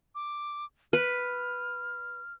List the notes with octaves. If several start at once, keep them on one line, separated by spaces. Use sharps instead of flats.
D6
B4 F6